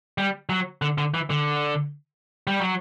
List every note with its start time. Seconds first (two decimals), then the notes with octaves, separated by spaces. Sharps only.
0.18 G3
0.49 F#3
0.82 D3
0.98 D3
1.14 E3
1.30 D3
2.47 G3
2.60 F#3